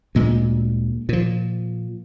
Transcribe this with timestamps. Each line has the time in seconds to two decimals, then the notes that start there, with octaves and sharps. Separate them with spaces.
0.15 D2 A#2 G#3
1.09 A#2 F3